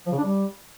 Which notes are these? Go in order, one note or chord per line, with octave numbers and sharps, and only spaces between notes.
F3
C#3
D4
G3